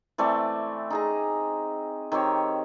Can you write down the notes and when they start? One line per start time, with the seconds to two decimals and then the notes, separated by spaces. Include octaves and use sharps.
0.18 E3 A3 C4 D5
0.90 D#4 G#4 A#5
2.12 D#3 C4 G4 C#5